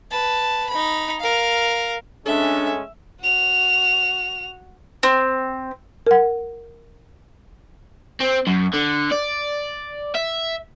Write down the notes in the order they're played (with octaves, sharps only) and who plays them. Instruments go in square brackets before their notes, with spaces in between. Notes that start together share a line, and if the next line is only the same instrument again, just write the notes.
[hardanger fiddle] B4 A5
D#4 B5
A#4 F5
[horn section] G#3 A3 C#4 [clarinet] D4 [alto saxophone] A4 [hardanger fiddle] E5
[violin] F#4 F7
[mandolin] C4
[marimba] A#4 F#5
[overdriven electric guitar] C4
F#2
D3
D5
E5